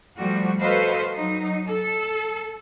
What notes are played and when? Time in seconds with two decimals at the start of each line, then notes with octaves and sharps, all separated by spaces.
0.19 F3 G3 A3 F#4
0.61 F#4 A4 B4 C5 D#5 F5
1.14 F#3 D#4
1.68 A4